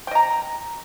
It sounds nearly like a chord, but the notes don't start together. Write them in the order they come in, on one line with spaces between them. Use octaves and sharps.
G5 D#5 A#5